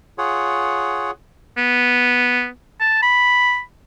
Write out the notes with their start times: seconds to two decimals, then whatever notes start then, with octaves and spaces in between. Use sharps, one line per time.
0.18 F4 G#4 C#5 F#5
1.57 B3
2.80 A5
3.02 B5